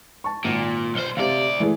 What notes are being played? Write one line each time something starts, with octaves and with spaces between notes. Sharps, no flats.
A5 C#6
G#1 A#2
B1 C5
D2 C3 D5 F5
E3 A3 G#4